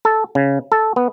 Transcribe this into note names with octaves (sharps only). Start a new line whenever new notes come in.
A4
C#3
A4
B3